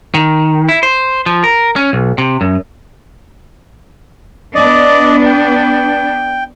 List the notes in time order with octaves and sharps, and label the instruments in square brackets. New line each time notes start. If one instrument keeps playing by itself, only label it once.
[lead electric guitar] D#3
E4
C5
F3
A#4
C#4
B1
C3
F#2
[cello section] B3 D4 [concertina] D5 D#5
[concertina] G5